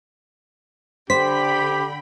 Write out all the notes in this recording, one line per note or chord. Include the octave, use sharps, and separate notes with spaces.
D3 G4 C5 G5 B5 B6